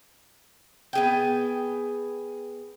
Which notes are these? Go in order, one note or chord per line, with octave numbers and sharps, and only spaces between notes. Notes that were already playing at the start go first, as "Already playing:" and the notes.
B3 G#4 G5